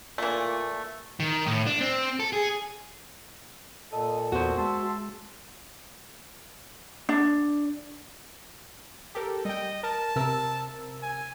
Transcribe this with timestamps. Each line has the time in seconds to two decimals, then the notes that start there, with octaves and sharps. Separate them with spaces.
0.18 A#2 E3 A3
1.20 D#3
1.47 A2
1.67 D4
1.81 C4
2.20 A4
2.33 G#4
3.93 A#2 A4 D#5
4.32 E2 B3 F#4 C5
4.58 G#3 E5 A5 C6
7.09 D4
9.15 G4 A4 A#4
9.45 G3 D#5 G5
9.83 A#4 A5
10.16 C3 A#4 E6
11.03 G#5